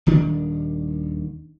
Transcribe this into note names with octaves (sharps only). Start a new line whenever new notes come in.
D#1 D#3 D4